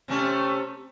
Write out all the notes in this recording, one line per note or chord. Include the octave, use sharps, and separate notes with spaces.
C3 A3 C#4